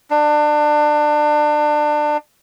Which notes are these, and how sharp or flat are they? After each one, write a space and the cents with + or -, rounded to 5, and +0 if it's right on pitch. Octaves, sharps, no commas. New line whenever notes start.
D4 +25